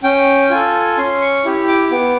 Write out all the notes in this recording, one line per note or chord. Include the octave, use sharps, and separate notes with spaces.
C#4 G5
F4 A4 G#5
C#4 C6
C#6
E4 G4
D6
B3 D6